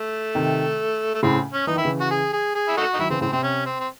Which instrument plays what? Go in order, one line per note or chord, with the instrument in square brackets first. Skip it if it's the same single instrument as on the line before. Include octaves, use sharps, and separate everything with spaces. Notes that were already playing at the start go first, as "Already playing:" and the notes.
Already playing: [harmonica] A3
[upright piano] C3 D#3
[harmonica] A3
[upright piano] A2 C#3 [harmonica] C4
[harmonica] C#4
[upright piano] E3 [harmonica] D#4
[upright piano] D#3 [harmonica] E4
[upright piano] C#3 E3
[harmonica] F#4
G#4
G#4
G#4
E4
A3 D#4 F#4
D#4
[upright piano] D#3 F#3 [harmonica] E4
[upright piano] C#3 E3 [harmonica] C4
[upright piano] A2 C#3 [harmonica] C4
[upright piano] C3 [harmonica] C4
[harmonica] C#4
C4
C4